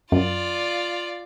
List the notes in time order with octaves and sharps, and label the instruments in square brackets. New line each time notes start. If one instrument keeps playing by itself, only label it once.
[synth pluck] F#2 [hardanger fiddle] F4 D5